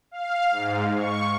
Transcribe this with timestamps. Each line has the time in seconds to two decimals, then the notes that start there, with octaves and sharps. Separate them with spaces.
0.11 F5
0.51 G#2
0.95 C#6